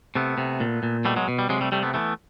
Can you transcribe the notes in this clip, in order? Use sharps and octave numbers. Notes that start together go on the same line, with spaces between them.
C3 A3 B3
C3
A#2
A#2
B2 G3 A3
F#3 G#3
B2
G3
C3 F#3 G#3
G3 A3
C3 G3 A3
A3 B3
E3 A3 B3